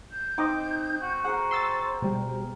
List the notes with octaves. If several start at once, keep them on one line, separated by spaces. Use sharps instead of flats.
G6
C4 D#4 D#5 D6
F#4
G#4 A#4 C5 F#5
C6 E6 A6
B2 G3